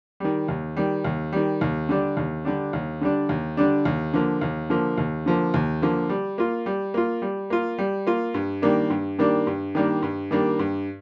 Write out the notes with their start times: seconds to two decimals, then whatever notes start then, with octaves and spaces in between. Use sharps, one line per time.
0.20 D#3 G3
0.48 D#2
0.77 D#3 G3
1.05 D#2
1.33 D#3 G3
1.61 D#2
1.89 D3 G3 D4
2.17 D#2
2.45 D3 G3 D4
2.73 D#2
3.01 D3 G3 D4
3.29 D#2
3.57 D3 G3 D4
3.85 D#2
4.13 D3 F3 A#3
4.41 D#2
4.70 D3 F3 A#3
4.98 D#2
5.26 D3 F3 A#3
5.54 D#2
5.82 D3 F3 A#3
6.09 G3
6.38 A#3 F4
6.66 G3
6.94 A#3 F4
7.22 G3
7.50 A#3 F4
7.78 G3
8.07 A#3 F4
8.34 G2
8.62 D#3 G3 A#3 D4
8.90 G2
9.19 D#3 G3 A#3 D4
9.47 G2
9.75 D#3 G3 A#3 D4
10.03 G2
10.31 D#3 G3 A#3 D4
10.59 G2